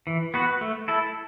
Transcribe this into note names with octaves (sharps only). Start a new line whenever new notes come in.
E3
B3 F#4 B4
A3
E4 A4